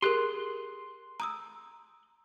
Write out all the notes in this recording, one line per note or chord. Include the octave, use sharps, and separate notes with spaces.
G4 G#4 A#4 C6 F#6
A#5 D#6 E6